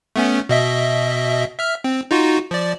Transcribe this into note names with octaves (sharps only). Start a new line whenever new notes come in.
A3 B3 C#4
B2 D#5 E5
E5 F6
C4
D#4 F4 F#4
F3 D5